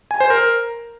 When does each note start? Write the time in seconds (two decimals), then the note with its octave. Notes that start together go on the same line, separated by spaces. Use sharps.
0.11 G#5
0.20 C5
0.30 A#4